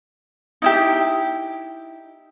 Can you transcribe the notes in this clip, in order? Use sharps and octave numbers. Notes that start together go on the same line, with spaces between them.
D#4 E4 G4